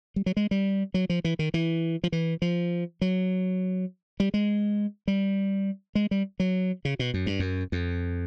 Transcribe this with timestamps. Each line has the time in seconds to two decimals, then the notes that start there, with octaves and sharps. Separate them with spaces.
0.16 G3
0.26 F#3
0.37 G#3
0.51 G3
0.94 F#3
1.10 F3
1.24 E3
1.39 D#3
1.54 E3
2.04 F3
2.12 E3
2.42 F3
3.01 F#3
4.20 G3
4.34 G#3
5.08 G3
5.95 G#3
6.11 G3
6.40 F#3
6.85 C#3
6.99 B2
7.14 F#2
7.26 G2
7.40 F#2
7.72 F2